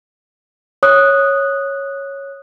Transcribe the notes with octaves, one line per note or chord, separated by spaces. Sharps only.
C#5 D#6 F#6